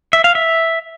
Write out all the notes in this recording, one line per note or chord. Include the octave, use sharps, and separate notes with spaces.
E5
F5
E5